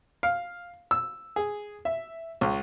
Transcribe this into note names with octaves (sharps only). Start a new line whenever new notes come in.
F5
E6
G#4
E5
C#2